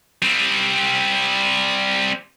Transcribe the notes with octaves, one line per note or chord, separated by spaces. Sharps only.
G3 C4